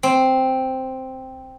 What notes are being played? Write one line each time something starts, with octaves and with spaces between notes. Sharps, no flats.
C4